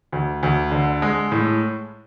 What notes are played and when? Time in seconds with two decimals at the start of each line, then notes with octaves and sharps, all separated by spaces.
0.12 D2
0.43 D2
0.72 D3
1.02 G#3
1.32 A2